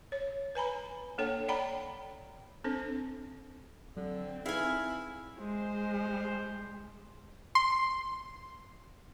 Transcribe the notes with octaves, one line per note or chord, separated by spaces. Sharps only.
C#5
B4 G#5 A#5 B5
A#3 D4 A4 C#5 G5
C#5 D5 F#5 G5 A#5 B5
C4 D4 A4 C5
D3 F#3 C4
D#4 E4 G#4 B4 F5 G#5
G#3 C5
C6